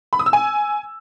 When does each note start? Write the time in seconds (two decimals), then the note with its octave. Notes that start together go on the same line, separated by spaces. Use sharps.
0.13 B5
0.19 D#6
0.26 E6
0.33 G#5